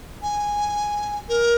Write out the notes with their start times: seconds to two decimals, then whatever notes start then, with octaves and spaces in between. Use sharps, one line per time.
0.23 G#5
1.29 A#4